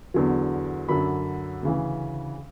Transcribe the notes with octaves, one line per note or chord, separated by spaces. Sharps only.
E2 D3 F#3
F#2 D3 F#3 B5
D2 C#3 E3